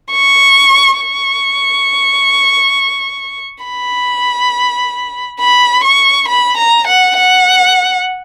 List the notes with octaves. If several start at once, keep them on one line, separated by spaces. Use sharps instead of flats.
C#6
C#6
B5
B5
C#6
B5
A#5
F#5
F#5